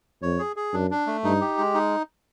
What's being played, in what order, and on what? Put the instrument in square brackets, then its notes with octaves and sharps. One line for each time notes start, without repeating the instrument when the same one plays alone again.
[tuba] F2 [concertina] C#5
[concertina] G#4
G#4
[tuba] F#2 [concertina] D4
[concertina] D4
A3
[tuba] G2 [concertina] D#4
[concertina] G4
G#3
D#4